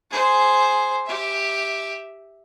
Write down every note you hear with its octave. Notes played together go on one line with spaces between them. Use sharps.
G#4 C5
G4 E5